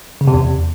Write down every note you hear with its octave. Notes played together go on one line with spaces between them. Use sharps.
C#3
C3
E2